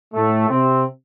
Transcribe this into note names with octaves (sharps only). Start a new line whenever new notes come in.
A2 A3
C3 C4